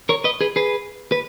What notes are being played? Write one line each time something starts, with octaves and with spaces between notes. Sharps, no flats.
A#4 C#5
B4 D#5
G#4 B4
G#4 B4
B4